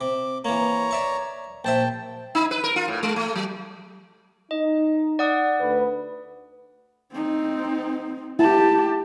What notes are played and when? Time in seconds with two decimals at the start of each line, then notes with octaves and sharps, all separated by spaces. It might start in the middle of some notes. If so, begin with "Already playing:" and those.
0.01 C3 D6
0.45 E3 A#3 C#5 A#5
0.91 D5 E5 C#6
1.65 A#1 C5 E5 G5 A5
2.35 D#4
2.51 B4
2.64 A#4
2.76 F4
2.88 A2
3.03 G#3
3.16 A3
3.35 F#3
4.51 D#4 D#5
5.19 D5 F#5 D#6
5.60 D2 B4
7.12 C4 D#4
8.39 E4 G4 A5